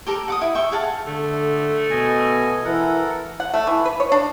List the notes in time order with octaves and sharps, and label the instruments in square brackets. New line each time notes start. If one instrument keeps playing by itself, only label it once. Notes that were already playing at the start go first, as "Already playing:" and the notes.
[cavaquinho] G4 A4 A#4
F#5 D6 D#6
E4
E5 G5 C#6
G#4 F5 F#5 A5
[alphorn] D3 [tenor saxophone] A3
[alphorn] B2 [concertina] D#5 G#5
[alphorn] E3 [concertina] A4 A#4 F#5
[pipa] F#5
A3
E3
B4
C#5
D4